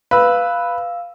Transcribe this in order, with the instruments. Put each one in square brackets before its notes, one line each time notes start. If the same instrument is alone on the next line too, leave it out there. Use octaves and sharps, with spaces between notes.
[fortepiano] B4 [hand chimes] F5 E6